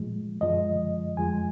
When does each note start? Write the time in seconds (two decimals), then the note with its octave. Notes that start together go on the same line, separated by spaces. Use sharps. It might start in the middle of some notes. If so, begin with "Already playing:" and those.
Already playing: A#2 F3 G#3
0.41 F#2 F3 G#3 D#5
1.17 F2 F3 G#3 G#5